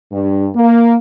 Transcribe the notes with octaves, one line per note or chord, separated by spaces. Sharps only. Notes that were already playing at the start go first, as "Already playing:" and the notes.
G2
A#3